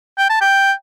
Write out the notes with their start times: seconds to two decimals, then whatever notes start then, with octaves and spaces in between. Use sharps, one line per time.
0.18 G5
0.29 A5
0.41 G5